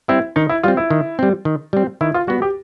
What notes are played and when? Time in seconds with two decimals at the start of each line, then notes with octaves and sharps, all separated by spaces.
0.08 G3 C4 E4
0.36 D#3 D#4
0.49 E4
0.63 G3 C4 F4
0.77 E4
0.90 D#3
1.19 G3 C4
1.45 D#3
1.73 G3 C4
2.01 D#3 E4
2.14 F4
2.27 G3 B3 F#4
2.42 G4